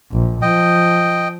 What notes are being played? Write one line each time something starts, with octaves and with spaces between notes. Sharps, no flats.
A#1
F3 D#5 G5